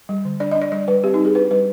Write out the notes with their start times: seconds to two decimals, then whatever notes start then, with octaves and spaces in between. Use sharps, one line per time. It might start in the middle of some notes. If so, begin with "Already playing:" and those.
0.09 G3
0.25 D3
0.40 D4 D5
0.51 D#5
0.56 D4
0.62 D5
0.72 G3 D5
0.88 G3 B4
1.04 C4 G4
1.14 D#4
1.19 G3
1.25 G#4
1.35 D4 B4
1.51 G3 B4